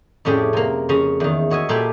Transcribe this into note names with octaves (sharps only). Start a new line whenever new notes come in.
F2 A2 C#4 G4 G#4 D5
C3 A#3
F2 C#3 C#4 A#5
E2 D#3
F#4 C#5 D#5 E5 G#5
A#2 G4 A4 D5 G#5 B5